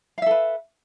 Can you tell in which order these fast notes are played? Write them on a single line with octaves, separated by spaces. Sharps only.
F5 E5 A4 B4